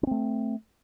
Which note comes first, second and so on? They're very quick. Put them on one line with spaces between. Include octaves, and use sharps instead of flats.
C#4 C4 A3